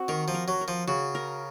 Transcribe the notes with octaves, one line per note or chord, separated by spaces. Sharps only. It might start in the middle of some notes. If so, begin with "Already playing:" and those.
Already playing: C4 F#4
D#3 A#4
F3
A#4
F#3
A#4
F3
C#3 F#4
A#4